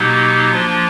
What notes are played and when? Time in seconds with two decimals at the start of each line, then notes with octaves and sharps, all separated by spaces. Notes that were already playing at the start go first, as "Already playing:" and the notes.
Already playing: B2 F#3 A#3 D#4 G4
0.52 F3 A#3 D4 F4